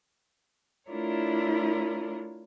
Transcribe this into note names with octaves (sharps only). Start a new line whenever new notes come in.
A3 D4 E4 F4 A#4 C#5